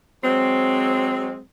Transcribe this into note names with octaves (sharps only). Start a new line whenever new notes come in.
F#3 G#3 C4